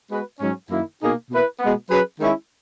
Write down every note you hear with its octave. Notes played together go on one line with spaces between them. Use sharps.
G#3 B3 F#4 B4
G#2 F#3 C#4
F#2 D#3 A#3 E4
B2 A#3 D#4 G#4
B2 A#3 E4 B4
B2 G#3 B3
F#3 C#4 G#4 B4
D#3 G#3 C#4 E4